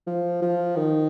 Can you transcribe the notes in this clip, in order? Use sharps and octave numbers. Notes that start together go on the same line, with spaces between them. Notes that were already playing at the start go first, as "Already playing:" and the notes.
F3
F3
D#3